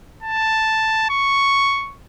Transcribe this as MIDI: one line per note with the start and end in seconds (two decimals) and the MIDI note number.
0.22 1.09 81
1.10 1.95 85